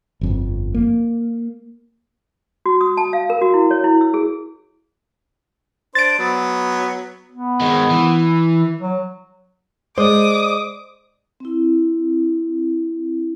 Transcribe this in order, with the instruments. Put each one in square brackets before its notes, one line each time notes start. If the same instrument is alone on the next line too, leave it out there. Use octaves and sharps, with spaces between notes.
[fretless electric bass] G1 F2
A#3
[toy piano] F#4
D#6
A5
F5
A#4
F#4
E4
C#5
E4
E6
G#4
[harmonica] D4 C5 [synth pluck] A6 D7
[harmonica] F#3 B3
[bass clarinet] B3
[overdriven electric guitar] D#3 G#3
E3
[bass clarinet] F#3
[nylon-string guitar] G#3 [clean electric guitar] C5 D5 [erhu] D6 [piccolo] D#6
[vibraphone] C4 E4